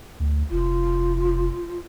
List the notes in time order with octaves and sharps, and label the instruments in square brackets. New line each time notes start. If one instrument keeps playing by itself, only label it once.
[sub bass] D2
[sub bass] F1 [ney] F4